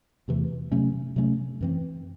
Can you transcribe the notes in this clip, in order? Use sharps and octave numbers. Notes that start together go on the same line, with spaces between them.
E2 C3 E3 A3
C3 F#3 A3 C#4
C3 F#3 A3 C#4
F#2 E3 C4